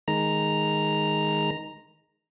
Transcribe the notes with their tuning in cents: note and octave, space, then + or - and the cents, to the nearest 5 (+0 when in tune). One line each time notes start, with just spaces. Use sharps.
D#3 +0 G#3 +0 A#5 +0